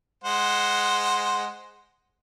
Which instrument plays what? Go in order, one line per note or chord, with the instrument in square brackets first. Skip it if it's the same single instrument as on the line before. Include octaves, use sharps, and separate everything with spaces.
[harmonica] G#3 C5 F#5